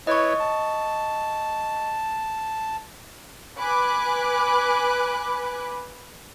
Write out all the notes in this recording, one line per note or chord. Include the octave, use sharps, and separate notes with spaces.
E4 B4 C#5 D#5 C#6
A5
B4 G#5 B5 D6 F#6